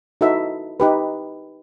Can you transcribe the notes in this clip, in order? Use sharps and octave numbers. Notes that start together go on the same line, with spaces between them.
D#4 E4 F#4 A4 B4 E5
D#4 G4 B4